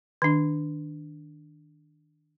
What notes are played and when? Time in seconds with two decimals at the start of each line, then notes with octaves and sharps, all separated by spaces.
0.22 D#3 D4